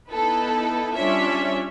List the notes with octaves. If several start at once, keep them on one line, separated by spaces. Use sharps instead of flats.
B3 D#4 E4 A4 B4
G3 C#4 D4 F4 C#5 E5